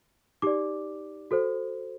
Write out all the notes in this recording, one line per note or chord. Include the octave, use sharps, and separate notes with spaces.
D#4 G4 D5 D6
F#4 A4 C5